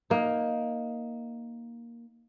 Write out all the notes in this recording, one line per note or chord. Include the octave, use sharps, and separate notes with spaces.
A#3 D#4